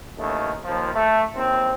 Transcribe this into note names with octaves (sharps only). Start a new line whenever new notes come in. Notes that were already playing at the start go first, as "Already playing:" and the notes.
A1 D#2 A3
D#2 F3
A3
D#2 C4